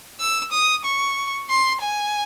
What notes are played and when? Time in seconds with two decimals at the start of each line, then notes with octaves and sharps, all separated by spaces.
0.20 E6
0.52 D#6
0.85 C#6
1.49 C6
1.81 G#5